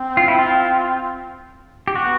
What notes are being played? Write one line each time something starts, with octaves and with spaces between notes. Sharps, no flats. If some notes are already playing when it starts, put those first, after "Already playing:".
Already playing: C4
F4
E4
F4
G4
B3 F#4